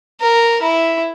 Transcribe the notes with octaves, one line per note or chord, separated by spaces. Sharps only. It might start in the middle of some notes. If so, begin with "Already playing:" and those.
A#4
E4